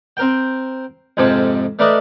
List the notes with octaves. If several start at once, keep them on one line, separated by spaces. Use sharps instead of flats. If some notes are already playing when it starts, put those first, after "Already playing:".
C4 A#4 G5
F2 G#2 C3 F3 A4 D6
A3 D4 A#4 B4 D5 D#5